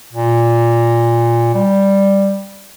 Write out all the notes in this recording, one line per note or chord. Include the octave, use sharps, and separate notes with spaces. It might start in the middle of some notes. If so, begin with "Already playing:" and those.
A#2
G3